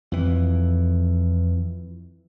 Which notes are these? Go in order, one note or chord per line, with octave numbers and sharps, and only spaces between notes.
F2 E3